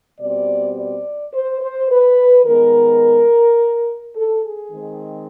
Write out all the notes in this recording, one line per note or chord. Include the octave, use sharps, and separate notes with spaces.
B2 G3 C4 D5
D5
C5
C5
B4
D#3 G#3 B3 A#4
A4
G#4
D#3 G#3 C4